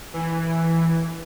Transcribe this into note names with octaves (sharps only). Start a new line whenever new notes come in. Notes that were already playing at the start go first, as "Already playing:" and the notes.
E3